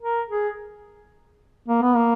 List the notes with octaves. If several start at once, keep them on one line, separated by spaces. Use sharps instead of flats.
A#4
G#4
A#3
B3
A#3